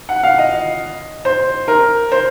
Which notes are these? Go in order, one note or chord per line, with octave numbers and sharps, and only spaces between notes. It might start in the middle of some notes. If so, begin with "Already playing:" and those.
F#5
F5
D#5
C5
A#4
C5